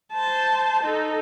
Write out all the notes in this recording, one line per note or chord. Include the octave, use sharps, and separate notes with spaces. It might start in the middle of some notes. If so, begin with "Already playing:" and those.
C5 A5
D#4 A4